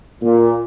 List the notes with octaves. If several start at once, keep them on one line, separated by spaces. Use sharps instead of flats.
A#2